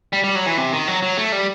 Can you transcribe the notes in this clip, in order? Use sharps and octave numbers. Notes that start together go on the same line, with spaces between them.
G3
G3
F#3
E3
C3
D#3
F#3
F#3
A3
G3